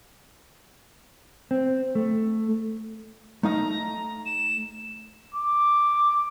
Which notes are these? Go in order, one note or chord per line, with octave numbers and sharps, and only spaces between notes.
C4
A3
A3 D#4 F5 A#5
E7
D6